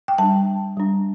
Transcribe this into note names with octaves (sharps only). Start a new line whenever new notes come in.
G5
G3 D4 A5
G3 D4